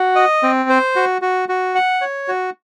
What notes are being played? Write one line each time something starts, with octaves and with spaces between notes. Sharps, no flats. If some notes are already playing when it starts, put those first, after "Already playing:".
Already playing: F#4
D#5
C4
C5
F#4
F#4
F#4
F#5
C#5
F#4